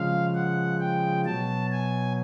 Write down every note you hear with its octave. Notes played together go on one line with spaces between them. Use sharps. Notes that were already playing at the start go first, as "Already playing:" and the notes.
Already playing: C#3 F3 G#3 F5
F#5
G5
B2 F#3 A5
G#5